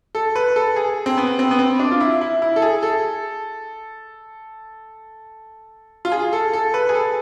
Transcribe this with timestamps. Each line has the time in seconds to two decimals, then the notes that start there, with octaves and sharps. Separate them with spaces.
0.15 A4
0.36 B4
0.56 A4
0.76 G#4
1.06 C4
1.17 B3
1.39 C4
1.51 B3
1.59 C4
1.79 D4
1.91 F4
2.00 E4
2.21 E4
2.42 E4
2.56 A4
2.62 G#4
2.83 A4
6.05 F4
6.12 G#4
6.33 A4
6.53 A4
6.74 B4
6.89 G#4
6.95 A4